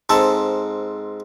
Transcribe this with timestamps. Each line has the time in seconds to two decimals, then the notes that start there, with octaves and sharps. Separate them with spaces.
0.09 G#2 C4 A4 A5